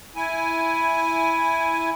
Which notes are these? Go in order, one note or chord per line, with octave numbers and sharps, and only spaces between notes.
E4 G#5